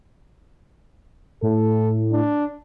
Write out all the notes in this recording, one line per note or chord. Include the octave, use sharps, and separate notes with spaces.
A2 A4
D4